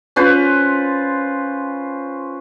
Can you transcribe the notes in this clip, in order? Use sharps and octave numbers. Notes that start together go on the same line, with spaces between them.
C#4 F4 B4 C5